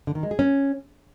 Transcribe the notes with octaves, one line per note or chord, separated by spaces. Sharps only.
D3
D#3
G#3
G#4
C#4